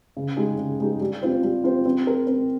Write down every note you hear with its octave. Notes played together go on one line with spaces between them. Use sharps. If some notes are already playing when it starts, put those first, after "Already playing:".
C#3
G#3 D#4 G4
C#3
G#3 D#4 G4
G3
C4 F4 C5
G3
C4 F4 C5
C4
G4 A#4
C4